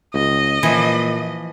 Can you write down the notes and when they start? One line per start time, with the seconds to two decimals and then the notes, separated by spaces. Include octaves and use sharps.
0.14 C#2 D#5
0.63 A#2 E3 F3